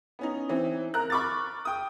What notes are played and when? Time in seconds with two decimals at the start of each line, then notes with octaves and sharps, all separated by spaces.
0.19 B3 C#4 D#4
0.49 E3 C4
0.94 A#4 A#5 F#6
1.10 B5 C#6 D6 F6 A6
1.65 G5 D#6